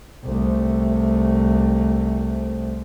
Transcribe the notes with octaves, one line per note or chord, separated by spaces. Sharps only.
C2 A3